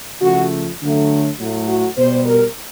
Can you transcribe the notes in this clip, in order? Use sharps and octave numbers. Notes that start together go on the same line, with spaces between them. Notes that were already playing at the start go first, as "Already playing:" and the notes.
C#3 F3 A3 F#4
D3 F#3 A3
A2 F#3 A3
F#4
B2 G3 C5
A#4